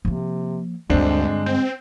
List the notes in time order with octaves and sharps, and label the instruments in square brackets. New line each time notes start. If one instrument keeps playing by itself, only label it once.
[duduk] C3 [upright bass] F3 A#3
[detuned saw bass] D2 [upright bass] G2 D3 [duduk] G#3 [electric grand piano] C4 D4 C5
[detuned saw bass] C4 [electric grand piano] G6